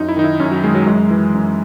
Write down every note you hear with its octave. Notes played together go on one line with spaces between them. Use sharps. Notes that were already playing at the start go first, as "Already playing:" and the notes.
Already playing: F#2 D#4
E4
D#3 D#4
E4
F#2 C#4
F#3
D#3 G#3
F#3
F#2 G#3
E3
F#2